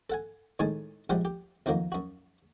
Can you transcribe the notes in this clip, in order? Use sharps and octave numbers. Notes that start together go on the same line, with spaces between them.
A4 F#5 G#5
A2 D#3 G#3 D#4 G#5 A5
A#1 F3 G3 G#3 G4 F#5
G4
B1 F2 D#3 F#3 A#3
F#2 F#4